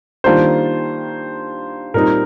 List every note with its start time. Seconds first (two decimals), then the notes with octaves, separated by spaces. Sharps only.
0.24 D#3 G3 A#3 D4 F4 C5
1.94 A#2 G3 C4 D#4 A#4